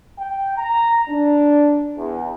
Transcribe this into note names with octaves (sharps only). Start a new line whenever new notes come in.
G5
A#5
D4
E2